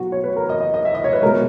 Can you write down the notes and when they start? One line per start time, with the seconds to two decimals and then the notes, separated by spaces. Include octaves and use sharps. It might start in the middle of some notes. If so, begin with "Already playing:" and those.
Already playing: B2 F#3 F#4
0.12 C#5
0.24 B4
0.36 A#4
0.49 D#5
0.60 D#5
0.74 D#5
0.85 E5
0.95 D#5
1.04 C#5
1.13 B4
1.22 G#3 A#4
1.26 B2